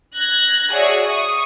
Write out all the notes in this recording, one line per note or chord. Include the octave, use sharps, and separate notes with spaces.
F#6 G#6 A#6
F#4 G#4 C#5 D5 E5
C#6 D#6